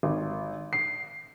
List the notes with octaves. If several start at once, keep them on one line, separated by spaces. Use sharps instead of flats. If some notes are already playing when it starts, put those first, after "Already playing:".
G#1
C7